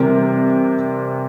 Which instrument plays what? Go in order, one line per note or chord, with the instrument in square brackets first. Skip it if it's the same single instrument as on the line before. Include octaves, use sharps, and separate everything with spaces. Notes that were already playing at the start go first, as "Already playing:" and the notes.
Already playing: [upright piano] C3 E3 G3 C4 A#4